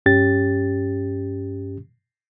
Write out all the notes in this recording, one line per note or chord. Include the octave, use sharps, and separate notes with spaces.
G2 C#4 G4 A6